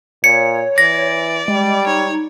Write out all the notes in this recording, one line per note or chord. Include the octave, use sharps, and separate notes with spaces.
A#2 C#5 C#7
E3 D5 A#6
G3 G#3
D#4 C#5